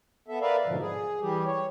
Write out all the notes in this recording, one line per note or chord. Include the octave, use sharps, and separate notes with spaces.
B3 A4 E5
A#4 B4 D5 E5 F5
G#2 B2 D3 F3
G#4
E3 G3 G4
C#5